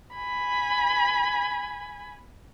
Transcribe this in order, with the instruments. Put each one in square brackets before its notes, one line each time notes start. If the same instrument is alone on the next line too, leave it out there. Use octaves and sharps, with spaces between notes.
[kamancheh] G#5 B5